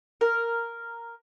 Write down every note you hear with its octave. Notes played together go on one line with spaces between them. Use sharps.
A#4